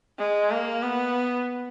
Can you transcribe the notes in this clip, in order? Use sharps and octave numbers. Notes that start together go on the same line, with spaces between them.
G#3
A#3
B3